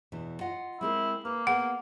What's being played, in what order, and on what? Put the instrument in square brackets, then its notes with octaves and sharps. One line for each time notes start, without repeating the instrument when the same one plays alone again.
[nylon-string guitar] E2 B2 E3
F4 D#5 F#5
[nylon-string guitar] G#3 C4 A#4 [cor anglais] E4
[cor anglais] A#3 [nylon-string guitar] B4
[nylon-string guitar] B3 G#4 [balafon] F#5